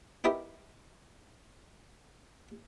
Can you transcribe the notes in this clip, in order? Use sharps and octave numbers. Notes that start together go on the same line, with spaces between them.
B3 D#4 E4 G4 A#4